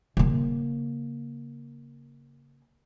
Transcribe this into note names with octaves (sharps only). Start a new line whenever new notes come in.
C#3 A#3